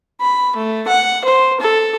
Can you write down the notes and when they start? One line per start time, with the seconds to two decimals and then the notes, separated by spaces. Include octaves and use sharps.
0.21 B5
0.56 A3
0.88 F#5
1.25 C5
1.60 A4